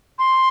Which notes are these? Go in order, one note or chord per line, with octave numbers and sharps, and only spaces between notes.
C6